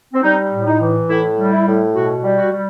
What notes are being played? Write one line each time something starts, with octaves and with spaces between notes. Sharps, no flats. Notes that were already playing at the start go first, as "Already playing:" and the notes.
C4
G3 D#4
A2
D#4
E3
A2 E4
G3
E4
A2
B2 F#4
G3
F#4
G3